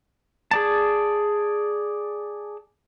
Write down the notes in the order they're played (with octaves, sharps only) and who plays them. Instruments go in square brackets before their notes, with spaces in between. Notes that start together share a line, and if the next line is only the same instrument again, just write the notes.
[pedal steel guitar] G#4 D5 A5